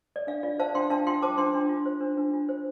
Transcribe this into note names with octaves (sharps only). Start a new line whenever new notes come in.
D5
D4 F5
F4 D5
C5 F5 A5
D4 G5 C6
D4 F5 A5
F4 G5 C6
C5 A5 D6
D4 G5 C6
D4
F4
C5
D4
D4
F4
C5